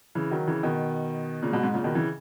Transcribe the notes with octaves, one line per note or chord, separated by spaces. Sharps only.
C#3 E3
D#3 F#3
C#3 E3
B2 D#3
A#2 C#3
G#2 B2
G#2
A#2 C#3
B2 D#3
C#3 E3